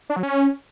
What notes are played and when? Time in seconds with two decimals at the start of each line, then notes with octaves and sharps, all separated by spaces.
0.10 D4
0.16 F#3
0.23 C#4